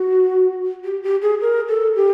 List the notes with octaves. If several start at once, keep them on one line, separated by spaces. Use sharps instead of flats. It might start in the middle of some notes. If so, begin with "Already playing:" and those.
Already playing: F#4
G4
G4
G#4
A#4
A4
G4